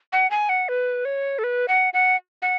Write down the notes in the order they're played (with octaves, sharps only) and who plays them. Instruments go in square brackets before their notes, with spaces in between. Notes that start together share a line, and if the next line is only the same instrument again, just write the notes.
[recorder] F#5
G#5
F#5
B4
C#5
A4
B4
F#5
F#5
F#5